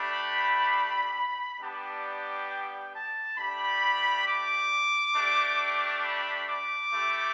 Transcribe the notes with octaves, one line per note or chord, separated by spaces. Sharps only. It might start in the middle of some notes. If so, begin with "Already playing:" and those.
Already playing: A3 D4 G4 B5
G3 B3 D4 G4 A5
G5
G5
A5
A3 D4 G4 B5
D6
A3 D4 G4
B5
D6
A3 E4 G4